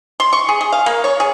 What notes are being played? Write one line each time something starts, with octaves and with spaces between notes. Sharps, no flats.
C6
C#6
G#4
G#4
F5
A#3
C#5
G#4